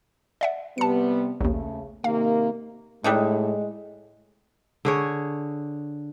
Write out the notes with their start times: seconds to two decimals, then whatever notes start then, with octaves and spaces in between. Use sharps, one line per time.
0.41 D5 E5 F#5
0.78 C3 G3 B3 A5 C#7
1.41 A#1 D#2 C#3 A3
2.04 C3 D#3 A#3 F5
3.04 A2 G3 G#3 D4 D#4
4.85 D3 G#4 C#5